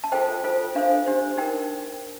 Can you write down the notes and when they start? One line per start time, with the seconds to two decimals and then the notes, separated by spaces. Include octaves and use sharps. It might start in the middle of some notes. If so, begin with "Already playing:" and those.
0.04 A5
0.12 F4 A4 C5 G5
0.44 F4 A4 C5
0.75 D4 A4 C5 F5
1.06 D4 G4 C5
1.37 D#4 A#4 G5